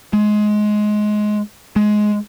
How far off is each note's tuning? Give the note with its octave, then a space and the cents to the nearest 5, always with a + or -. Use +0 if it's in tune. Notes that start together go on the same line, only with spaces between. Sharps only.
G#3 +20
G#3 +15